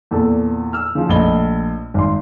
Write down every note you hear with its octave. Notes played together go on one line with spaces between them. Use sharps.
E2 A#2 A4
E6 F6
C#3 F3
A#1 A3 D#5 B5 G7
G#1 C6